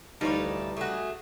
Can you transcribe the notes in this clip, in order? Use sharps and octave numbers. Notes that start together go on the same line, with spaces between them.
D2 E3 G3 D#4 F4 B4 C#5 A5
A3 F#4 G#4